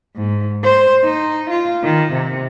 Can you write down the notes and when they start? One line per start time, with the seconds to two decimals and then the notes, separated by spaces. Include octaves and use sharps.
0.17 G#2
0.64 C5
1.04 D#4
1.50 F4
1.84 D#3
2.12 C3